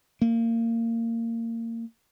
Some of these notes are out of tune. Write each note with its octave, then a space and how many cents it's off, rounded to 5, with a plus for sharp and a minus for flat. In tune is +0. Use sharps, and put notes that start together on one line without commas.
A#3 -25